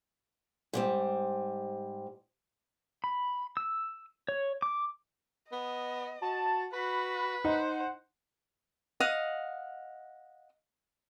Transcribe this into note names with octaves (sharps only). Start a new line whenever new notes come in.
G#2 G3 C4
B5
E6
C#5
D6
B3 D#5
F#4 A5
F#4 B4 B5
D#4 C5 F#5
D#5 F5 F#5 D#6